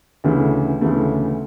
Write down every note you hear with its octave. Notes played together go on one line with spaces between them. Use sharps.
D2 C#3 E3 A3
D2 C#3 E3 A3